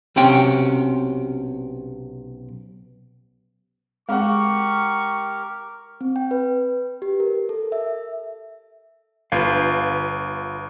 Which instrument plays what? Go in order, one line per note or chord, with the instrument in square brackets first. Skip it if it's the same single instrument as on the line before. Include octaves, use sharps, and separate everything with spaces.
[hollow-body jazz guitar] B1 C3 C#4 G5
[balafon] G#3 C4 G#4 [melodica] G4 A#4 [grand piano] F5 F#5 [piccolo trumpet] C#6
[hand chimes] C4
G5
B4
G4
A#4
A4
E5
[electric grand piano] G1 [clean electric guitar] F4 B4 F5